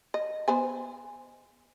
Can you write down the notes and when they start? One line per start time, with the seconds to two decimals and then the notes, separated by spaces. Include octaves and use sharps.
0.14 D#5
0.48 B3 C5 G#5